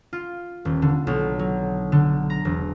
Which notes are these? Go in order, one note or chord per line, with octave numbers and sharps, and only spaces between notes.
F4
D#1
D3
B1
F#3
D3
A#5
E1